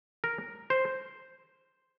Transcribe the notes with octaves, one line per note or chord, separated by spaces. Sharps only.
A#4
C5